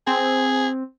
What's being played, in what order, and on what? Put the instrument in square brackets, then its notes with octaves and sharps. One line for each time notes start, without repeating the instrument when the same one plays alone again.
[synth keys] C4 [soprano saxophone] G#4